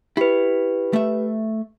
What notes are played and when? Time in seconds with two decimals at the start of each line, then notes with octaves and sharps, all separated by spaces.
0.17 E4 G4 B4
0.93 A3 E5